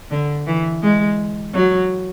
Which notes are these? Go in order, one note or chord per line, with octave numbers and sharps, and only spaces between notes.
D3
E3
G#3
F#3